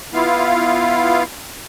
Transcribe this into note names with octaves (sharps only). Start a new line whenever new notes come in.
B3 E4 F4 F5